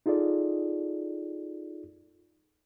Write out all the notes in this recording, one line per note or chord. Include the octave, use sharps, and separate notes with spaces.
D#4 F4 G#4 A4 D5